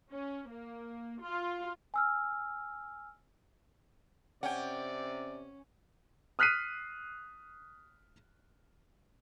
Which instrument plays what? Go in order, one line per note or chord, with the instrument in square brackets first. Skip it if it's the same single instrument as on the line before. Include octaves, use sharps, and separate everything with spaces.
[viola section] C#4
A#3
F4
[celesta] G#5 E6 F6
[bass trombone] C3 [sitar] C#4 [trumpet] D5 [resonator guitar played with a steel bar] F#5 G5
[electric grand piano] D#6 F6 F#6 B6 C7 D#7